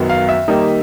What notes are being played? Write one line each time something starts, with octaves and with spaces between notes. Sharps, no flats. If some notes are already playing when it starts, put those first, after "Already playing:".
Already playing: F#2 D#3 F#3 B3
F5
E5
D#3 G3 A#3 D#4